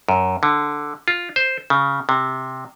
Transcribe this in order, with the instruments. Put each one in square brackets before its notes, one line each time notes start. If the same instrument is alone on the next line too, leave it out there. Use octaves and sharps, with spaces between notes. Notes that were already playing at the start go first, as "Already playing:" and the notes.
[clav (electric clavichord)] F#2
D3
F4
C5
C#3
C3